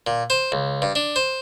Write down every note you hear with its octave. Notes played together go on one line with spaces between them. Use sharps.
A#2
C5
C#2
G2
D4
C5